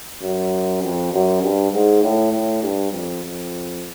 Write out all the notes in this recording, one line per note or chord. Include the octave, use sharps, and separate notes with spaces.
F#2
F2
F#2
G2
G#2
A2
A2
G2
F2
F2